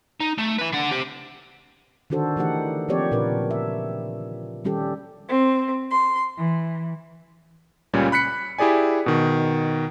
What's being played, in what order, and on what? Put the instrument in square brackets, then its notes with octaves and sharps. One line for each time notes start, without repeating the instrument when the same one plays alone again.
[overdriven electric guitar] D#4
A3
E4 B4
D3 F#5
G4 C5
[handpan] D3 D#3 D4 F#4 A4 C5
D3 E3 A3 D#4 G4 F#5
F3 A#3 C4 G4 C#5 D5
A#2 C#3 D4 A#4 B4
E5
D#3 G3 C#4 G4 A4
[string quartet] C4
C6
E3
[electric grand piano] C#2 A#2 G3 C#4
B5 F#6 B6 C#7
E4 G4 G#4 D5 G#5
B2 D#3